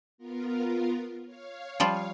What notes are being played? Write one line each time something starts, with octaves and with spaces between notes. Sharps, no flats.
B3 F4 A#4
C#5 F5
F3 G3 F4